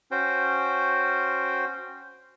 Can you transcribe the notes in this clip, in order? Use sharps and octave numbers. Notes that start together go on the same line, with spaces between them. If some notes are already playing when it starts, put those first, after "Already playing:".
C#4 F#4 C5 G5